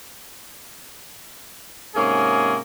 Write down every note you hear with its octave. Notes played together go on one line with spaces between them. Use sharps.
G#2 C3 A#3 C#4 G#4